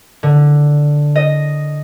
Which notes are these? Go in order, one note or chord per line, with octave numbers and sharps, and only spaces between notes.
D3
D#5